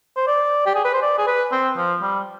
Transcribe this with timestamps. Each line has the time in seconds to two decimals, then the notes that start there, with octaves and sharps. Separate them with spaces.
0.16 C5
0.27 D5
0.66 G4
0.75 G#4
0.84 B4
0.94 C5
1.02 D5
1.18 G#4
1.27 B4
1.52 C4
1.77 F3
2.02 G3